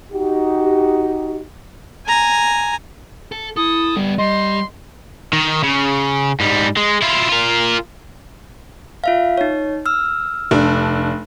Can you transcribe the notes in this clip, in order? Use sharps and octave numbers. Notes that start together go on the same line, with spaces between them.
D#4 F#4 G4
G#5 A#5
A4
E4 A4 D#6
G3 B3 G4
G3 D#5 C6
D#3
C#3
G#2 G3
G#3
E4 F4
F4 A#4
F4 E5 F5
D#4 C#5
E6 F6
F1 D4